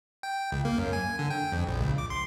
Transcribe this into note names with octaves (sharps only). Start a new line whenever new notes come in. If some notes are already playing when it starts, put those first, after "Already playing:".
G5
C#2
A#3
F#2
G#5
D3
G5
F2
A#1
C#2
D6
C6